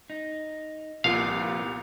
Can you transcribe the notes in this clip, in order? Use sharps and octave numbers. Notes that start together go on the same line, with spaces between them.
D#4
C2 A#2 F3 B3 F4 F5